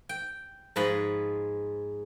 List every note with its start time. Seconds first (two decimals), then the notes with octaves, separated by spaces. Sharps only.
0.09 G5
0.76 G#2 F3 G#3 B4 D#5 B5